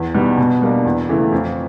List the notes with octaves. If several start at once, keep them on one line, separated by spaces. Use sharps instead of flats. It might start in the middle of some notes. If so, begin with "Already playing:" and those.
Already playing: E2
B2 G3 B3 D#4
B2
G3 A#3 D4
E2
C#3 E3 A3
F2